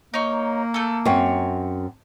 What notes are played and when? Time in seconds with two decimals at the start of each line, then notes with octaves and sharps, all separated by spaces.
0.14 A#3 D#4 C#5
0.74 A3 A4
1.05 F#2 C4 C#5